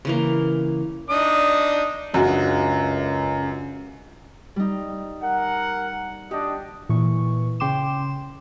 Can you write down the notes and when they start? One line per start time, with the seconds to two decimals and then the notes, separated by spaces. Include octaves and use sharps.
0.05 C#3 E3 A#3
1.10 D4 D#4 D#6
2.14 C#2 F#2 D4 F#4 D#5
4.56 G3 D#4
5.22 A#4 F#5
6.31 D4 G4 D#5
6.89 A#2 E3 C#6
7.60 C#3 G5 C6 D6 E7